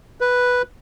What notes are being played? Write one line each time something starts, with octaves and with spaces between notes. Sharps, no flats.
B4